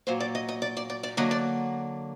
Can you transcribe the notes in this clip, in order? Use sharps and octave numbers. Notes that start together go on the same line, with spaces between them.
A#2 F#3 A#3 C5
D5
D#5
D#5
D5
D5
D5
D5
D3 F#3 A#3 D#5
D5